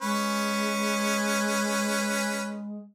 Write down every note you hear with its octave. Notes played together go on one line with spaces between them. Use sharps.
G#3 C#4 B4